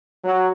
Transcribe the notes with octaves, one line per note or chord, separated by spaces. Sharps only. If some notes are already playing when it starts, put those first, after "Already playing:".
F#3